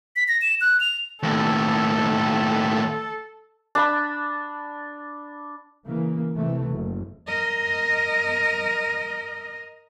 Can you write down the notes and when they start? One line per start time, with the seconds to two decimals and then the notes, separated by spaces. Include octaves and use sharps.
0.16 B6
0.28 A#6
0.42 E7
0.61 F#6
0.80 F7
1.23 D#2 A2 A4
3.75 D4 A5 B5
5.86 C#3 E3 A#3
6.36 C3 E3 A3
6.72 F#1
7.27 A#4 D#5